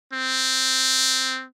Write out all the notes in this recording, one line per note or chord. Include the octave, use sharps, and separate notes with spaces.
C4